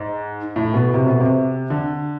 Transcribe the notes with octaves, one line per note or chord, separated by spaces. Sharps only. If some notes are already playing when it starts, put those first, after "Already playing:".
Already playing: G#2
A2
B2
C3
B2
C3
D3